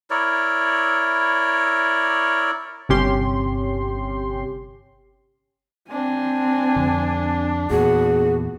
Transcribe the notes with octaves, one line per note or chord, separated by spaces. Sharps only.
E4 A#4 C#5 D5
G1 C3 C#4 G4 C6
C4 D4 G#5
F2 D3
E2 A#2 B3 F#4 G#4